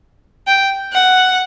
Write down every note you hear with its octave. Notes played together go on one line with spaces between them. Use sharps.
G5
F#5